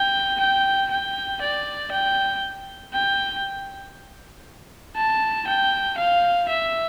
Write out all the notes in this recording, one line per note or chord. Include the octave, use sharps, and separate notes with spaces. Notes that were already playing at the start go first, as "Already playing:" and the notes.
Already playing: G5
G5
G5
D5
G5
G5
A5
G5
F5
E5